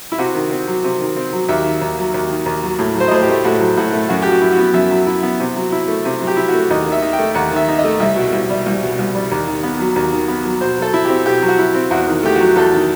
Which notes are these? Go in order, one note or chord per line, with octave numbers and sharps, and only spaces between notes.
E4
C3 F#4
D#3
C4
F#3
C3
D#3
C4
F#3
D#2 E5
D#3
D#2
F#3
D#2
D#3
D#2
F#3
A2
F#3
C5
D#5
A2 C5
G4
A3
A2 F#4
F#3
A2 F#4
A3
F#2 F#4
G4
F#3 F#4
E4
F#4
B3
F#2 E5
F#3
E4
B3
C3
F#3
E4
A3
C3
F#3
G4
E4
F#4
A3
D#2 D#5
D#3
E5
D#4
G5
A3
D#2 F#5
D#3 E5
D#4
D#5
A3
C2 E5
B2
C2
G3
C2
B2
C2
G3
D#2
D#3
B3
F#3
D#2
D#3
B3
F#3
B2 C5
F#3 A4
E4
C4 G4
B2 G4
F#3
F#4
E4
C4
E2 F#4
D#3
A3 G4
F#4
F#3
E2 A4
D#3